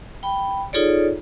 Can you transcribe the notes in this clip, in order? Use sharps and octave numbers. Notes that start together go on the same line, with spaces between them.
G5 B5
D#4 F4 G#4 A4 C#5 D5